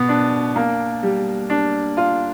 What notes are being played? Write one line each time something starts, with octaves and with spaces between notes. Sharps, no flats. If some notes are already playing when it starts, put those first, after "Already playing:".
Already playing: B2 B3
D4
A#3
G3
D4
F4